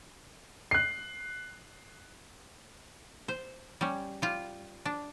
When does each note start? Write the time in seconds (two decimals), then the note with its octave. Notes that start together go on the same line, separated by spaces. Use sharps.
0.71 F#6 C7
3.28 C5
3.81 G3 C#4
4.22 G3 F4
4.85 D4